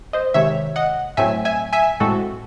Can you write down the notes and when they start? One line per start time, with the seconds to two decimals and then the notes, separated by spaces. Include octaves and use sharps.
0.13 C5 D#5
0.34 C3 D#3 G#3 C#5 E5
0.76 D#5 F#5
1.17 A2 F#3 A3 C4 E5 G#5
1.45 E5 G#5
1.73 E5 G#5
2.00 A2 G#3 C4 F#4 A4